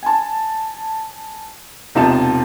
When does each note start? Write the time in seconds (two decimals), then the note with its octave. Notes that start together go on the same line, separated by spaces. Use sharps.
0.03 G#5 A5
1.95 E1 C3 D#4 F4 A5 E7